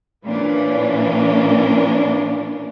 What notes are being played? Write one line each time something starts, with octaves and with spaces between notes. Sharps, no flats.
A#2 E3 C#4 D4